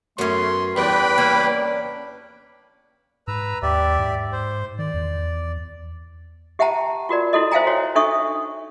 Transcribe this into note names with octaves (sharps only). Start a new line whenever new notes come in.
F#2 A3 B3 C#4 C6
E2 G3 B4 G5 B5
A#3 C#4 D4
G#2 B4 A#5 E6
D#2 G4 D5 E5
G#2
C5
D#3 D5
E2
G4 E5 F#5 G5 A5 A#5
F4 F#4 A#4 D5
E4 F#4 A4 D#5
C5 E5 F5 G5 G#5 A#5
F#4 C#5
D4 D#4 A4 E5 C#6 D#6